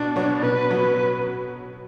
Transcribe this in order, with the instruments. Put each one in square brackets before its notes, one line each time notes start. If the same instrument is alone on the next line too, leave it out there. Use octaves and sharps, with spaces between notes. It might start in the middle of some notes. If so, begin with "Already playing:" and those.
Already playing: [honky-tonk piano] B2 [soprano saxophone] D4
[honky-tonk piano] F#3 B3 F#4 C#5
[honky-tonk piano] B2 [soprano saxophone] B4
[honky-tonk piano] F#3 B3 F#4 C#5